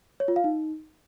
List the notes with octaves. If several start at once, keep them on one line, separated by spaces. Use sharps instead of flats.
C#5
F4
F5
D#4